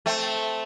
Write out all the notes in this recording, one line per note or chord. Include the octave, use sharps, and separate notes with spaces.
A3 C4